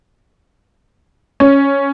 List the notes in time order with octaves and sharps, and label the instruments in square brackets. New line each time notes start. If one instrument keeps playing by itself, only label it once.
[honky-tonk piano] C#4